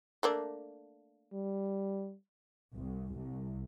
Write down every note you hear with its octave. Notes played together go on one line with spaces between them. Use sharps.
A3 A#3 D4
G3
C2
C2